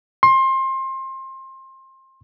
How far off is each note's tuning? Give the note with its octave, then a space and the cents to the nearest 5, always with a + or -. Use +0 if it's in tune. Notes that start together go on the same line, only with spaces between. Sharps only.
C6 +25